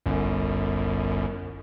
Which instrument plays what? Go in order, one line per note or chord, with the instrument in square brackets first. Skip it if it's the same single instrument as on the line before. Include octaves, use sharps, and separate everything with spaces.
[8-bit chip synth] G1 C2 F#2